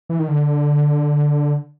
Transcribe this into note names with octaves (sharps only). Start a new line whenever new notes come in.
E3
D#3
D3